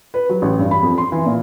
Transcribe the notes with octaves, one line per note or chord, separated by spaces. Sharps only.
B4
F#3
A1
G2
B5
F2
C6
E3
A#2